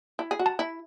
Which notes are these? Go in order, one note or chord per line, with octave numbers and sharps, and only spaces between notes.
E4
G#4
F#4
A5
E4